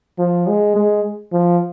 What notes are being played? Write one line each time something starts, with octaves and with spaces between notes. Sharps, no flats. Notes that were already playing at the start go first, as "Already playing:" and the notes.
F3
G#3
G#3
F3